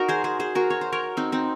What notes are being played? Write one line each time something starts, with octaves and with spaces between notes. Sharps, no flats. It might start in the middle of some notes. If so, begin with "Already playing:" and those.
Already playing: D#4 F#4 A#4
G#4 C5
G#4 C5
G#4 C5
F#4 A#4
C#5
C5
A#4 C#5
C4 D#4
C4 D#4